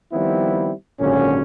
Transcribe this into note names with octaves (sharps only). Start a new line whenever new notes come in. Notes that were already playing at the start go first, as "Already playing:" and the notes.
D#3 F3 G3 B3 C4 E4
G#1 A#2 D3 F#3 C#4